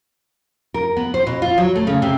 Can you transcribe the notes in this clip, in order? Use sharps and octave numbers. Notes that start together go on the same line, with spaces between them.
A#4
B3
C5
B2
F4
F#3
A3
C#3
C3